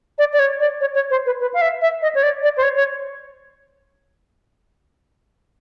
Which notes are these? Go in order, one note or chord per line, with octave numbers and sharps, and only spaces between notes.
D5
D5
C#5
D5
C#5
C#5
C5
B4
B4
F5
E5
E5
D#5
C#5
D5
D5
C5
C#5
C#5